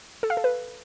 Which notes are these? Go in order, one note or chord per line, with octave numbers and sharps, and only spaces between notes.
A4
F5
A4
B4